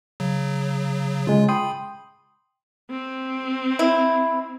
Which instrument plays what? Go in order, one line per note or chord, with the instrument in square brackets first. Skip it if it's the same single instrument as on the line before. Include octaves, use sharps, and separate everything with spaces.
[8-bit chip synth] C#3 F#3
[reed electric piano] C#3 G#3 [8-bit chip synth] F4
[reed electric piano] G5 C6 D#6 [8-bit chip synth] B5
[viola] C4
[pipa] E4